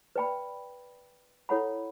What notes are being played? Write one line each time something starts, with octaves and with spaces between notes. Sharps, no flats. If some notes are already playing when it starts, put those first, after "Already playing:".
B4 D5 G5 B5
E4 A4 C#5 F#5 B5